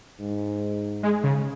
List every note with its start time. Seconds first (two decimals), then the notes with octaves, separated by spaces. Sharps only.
0.20 G#2
1.03 G#3
1.23 C#3